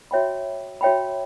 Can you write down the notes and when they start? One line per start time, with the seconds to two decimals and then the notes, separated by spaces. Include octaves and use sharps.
0.11 F#4 C#5 E5 G5 B5
0.81 F#4 C#5 E5 G5 B5